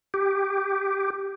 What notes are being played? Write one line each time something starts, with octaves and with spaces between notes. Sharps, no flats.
G4